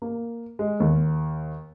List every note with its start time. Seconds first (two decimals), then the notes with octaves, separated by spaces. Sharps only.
0.02 A#3
0.59 G#3
0.80 D#2